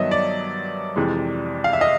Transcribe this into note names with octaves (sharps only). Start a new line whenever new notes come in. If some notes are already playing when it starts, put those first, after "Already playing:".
Already playing: G2 D#3 F#3 B3 D#5 E5
D5
F2 C3 E3 G#3
F5
E5
D#5